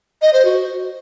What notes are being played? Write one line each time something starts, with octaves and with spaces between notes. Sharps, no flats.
D#5
C5
F#4